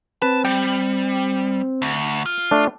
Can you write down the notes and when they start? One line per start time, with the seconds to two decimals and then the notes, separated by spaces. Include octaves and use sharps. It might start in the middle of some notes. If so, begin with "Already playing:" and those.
0.22 C4 B4 A5
0.45 G3 G5
1.82 D2
2.26 F4
2.51 A3 D4